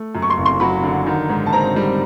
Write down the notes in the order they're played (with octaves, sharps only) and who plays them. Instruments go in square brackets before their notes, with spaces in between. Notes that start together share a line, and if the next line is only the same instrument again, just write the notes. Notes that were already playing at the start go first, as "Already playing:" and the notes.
Already playing: [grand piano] A3
F#2
[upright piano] C#6
C6
[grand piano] F#1
[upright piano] C6
[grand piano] F#3 [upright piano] B5
[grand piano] D3
D#3
G#2
[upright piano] A5
[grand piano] C4 [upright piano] A#5
[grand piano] G3